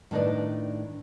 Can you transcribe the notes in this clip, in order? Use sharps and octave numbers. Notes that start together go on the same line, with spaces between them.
A2 D#3 D4 D#4 B4 D5